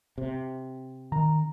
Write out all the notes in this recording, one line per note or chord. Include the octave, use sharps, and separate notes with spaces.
C3
D#3 A#5